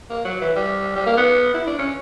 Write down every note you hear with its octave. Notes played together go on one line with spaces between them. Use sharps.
A#3
F#3
E3
G3
G3
A#3
B3
E4
D4
C#4